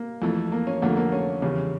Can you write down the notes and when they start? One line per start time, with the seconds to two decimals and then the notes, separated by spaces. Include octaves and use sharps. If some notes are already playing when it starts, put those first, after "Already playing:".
Already playing: A#3
0.22 F2 E3 A3
0.52 A#3
0.67 C#4
0.82 F2 D3 A3 A#3
0.97 A#3
1.12 C#4
1.42 E2 C#3 G3